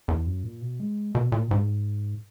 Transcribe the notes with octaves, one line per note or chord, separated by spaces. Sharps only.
E2
F#2
A#2
B2
G#3
B2
A#2
G#2